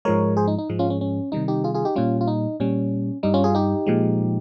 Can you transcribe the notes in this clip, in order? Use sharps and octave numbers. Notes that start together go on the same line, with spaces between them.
G#2 F3 G#3 A#4 C#5
G#4 C5
D#4
D#4
G#2 F3 G#3
C#4 F4
C#4
C#4
C3 D#3 G3 D#4
D#4 G4
F4 G#4
F4 G#4
D#4 G4
A#2 G3 C#4 F4
F4
D#4
A#2 G3 C#4
G2 G3 D#4
C#4 F4
F4 G#4
D#4 G4
A#2 F3 G#3